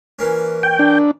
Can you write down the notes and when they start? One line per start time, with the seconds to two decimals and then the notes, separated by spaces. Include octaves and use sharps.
0.19 E3 A#3 C#4
0.63 G5
0.79 D4